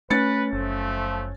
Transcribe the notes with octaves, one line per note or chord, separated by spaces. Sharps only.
A3 C#4 B4 A6 C#7
F#1 F3 A3